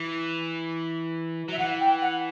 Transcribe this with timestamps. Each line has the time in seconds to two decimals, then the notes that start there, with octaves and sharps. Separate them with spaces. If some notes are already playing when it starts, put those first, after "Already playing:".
Already playing: E3
1.49 F#3 E5
1.58 E3 F#5
1.80 G5
2.02 F#5